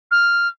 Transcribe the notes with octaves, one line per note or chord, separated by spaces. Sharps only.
F6